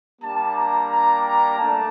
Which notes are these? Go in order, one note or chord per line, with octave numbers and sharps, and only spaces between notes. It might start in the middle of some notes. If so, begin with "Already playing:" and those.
G3 A#3 D4 G4 A5
A#5
A#5
A#5
A3 D4 A5